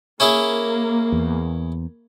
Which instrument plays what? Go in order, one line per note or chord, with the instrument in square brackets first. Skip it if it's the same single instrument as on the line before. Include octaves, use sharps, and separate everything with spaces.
[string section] A#3 [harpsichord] C#4 E4 G#4
[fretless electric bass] E2